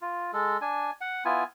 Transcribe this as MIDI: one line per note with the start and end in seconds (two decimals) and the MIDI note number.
0.02 0.31 65
0.33 0.57 56
0.33 0.57 69
0.61 0.91 62
0.61 0.91 80
1.01 1.24 78
1.25 1.44 59
1.25 1.44 64
1.25 1.44 65
1.25 1.44 80